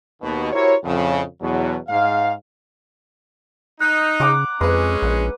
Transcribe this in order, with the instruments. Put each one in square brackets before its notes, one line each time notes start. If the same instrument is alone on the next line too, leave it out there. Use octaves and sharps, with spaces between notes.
[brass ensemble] D#2 B2
E4 F#4 G4 A#4 C5 C#5
F2 A2 C#3
E2 B2 F#3
G#2 F5
[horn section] D#4 [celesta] F#6
[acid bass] C#3 [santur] F#5 A#5 D6
[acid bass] F2 [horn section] G#3 C#4 [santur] B4
[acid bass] A#1